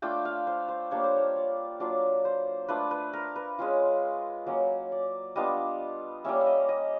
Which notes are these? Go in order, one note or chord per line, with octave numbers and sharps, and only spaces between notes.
A3 D4 F4 G5
F5
C5
C5
G3 A#3 D4 F4 C#5
C5
C#5
D5
F#3 A#3 D4 F4 D5
C5
A3 D4 F4 B4
B4
A#4
B4
G#3 C#4 F4
F#3 A#3 C#4 C#5
D5
G3 B3 D4 F4 D#5
G3 A#3 C#4 E5
E5
D#5
D#5